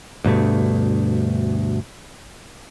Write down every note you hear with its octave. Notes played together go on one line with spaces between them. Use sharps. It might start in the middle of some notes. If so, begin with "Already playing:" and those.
D2 G2 B2 A3